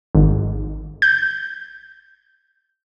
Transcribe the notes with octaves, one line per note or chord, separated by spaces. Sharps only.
G#1
G6